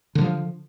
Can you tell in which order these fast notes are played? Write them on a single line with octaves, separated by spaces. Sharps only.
D3 G3 F3